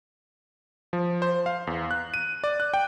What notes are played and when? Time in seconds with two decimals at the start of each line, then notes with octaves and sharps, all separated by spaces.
0.93 F3
1.22 C5
1.46 F5
1.67 E2
1.91 F#6
2.14 D#7
2.44 D5
2.60 F#6
2.74 G5